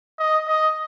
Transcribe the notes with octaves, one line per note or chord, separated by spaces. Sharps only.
D#5
D#5